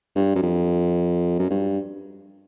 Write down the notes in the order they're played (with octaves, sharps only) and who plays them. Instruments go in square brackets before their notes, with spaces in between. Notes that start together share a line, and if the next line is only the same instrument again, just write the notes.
[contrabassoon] G2
F#2
F2
F#2
G2